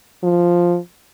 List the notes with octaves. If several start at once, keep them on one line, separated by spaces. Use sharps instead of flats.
F3